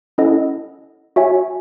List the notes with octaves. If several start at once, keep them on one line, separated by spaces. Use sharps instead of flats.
C#4 E4 A4 D#5 F#5
F#4 C#5 E5 G#5